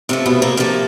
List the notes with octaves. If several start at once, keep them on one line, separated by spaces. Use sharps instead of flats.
C3 F3 A3 A#3
B2 B3
A#3
C3 F3 A3 A#3